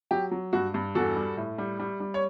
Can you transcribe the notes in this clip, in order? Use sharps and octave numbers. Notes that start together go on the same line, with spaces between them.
F#3 G4
F#3
G2 F#4
G2
E2 F#4 A4
G3
A2
G3
G3
G3
C#5